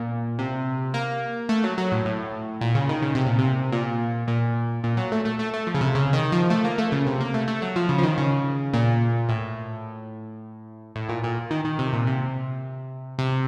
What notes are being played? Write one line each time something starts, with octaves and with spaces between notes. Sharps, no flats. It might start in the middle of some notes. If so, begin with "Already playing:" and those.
Already playing: A#2
C3
A#3
A3
F#3
F#3
A2
A2
A#2
C#3
D#3
C#3
C3
A#2
C3
A#2
A#2
A#2
F#3
A3
A3
A3
A3
F3
C#3
C3
C#3
D#3
F3
A3
A#3
A3
C#3
C3
A#3
A3
A3
F#3
F3
C#3
F3
D#3
C#3
A#2
A2
A2
A#2
A#2
D#3
D#3
C3
A#2
C3
C3